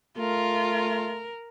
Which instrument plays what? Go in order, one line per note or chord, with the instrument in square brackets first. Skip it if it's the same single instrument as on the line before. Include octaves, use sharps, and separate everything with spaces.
[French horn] A3 [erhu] F4 [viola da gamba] A#4